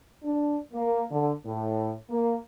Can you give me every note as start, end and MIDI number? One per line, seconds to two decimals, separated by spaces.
0.24 0.56 62
0.73 1.03 58
1.11 1.32 50
1.45 1.92 45
2.10 2.35 58